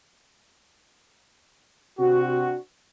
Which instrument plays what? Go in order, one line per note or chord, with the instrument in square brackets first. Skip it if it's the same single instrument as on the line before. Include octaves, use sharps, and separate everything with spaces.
[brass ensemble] C3 C4 D4 F#4